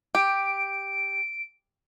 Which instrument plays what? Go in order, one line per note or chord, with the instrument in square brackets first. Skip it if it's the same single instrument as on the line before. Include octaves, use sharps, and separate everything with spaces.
[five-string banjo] G4 [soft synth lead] D7